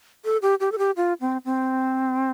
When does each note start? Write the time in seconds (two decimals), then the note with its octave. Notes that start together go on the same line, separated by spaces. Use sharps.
0.25 A4
0.42 G4
0.60 G4
0.72 A4
0.78 G4
0.97 F4
1.21 C4
1.45 C4